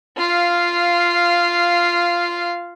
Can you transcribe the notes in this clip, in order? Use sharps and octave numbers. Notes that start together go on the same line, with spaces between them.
F4 F5